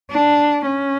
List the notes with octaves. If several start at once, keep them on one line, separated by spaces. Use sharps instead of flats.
D4
C#4